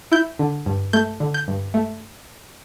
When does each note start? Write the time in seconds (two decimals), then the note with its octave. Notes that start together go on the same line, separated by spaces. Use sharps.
0.12 E4 G6
0.39 D3
0.66 G2
0.93 A3 G6
1.20 D3
1.34 G6
1.48 G2
1.74 A3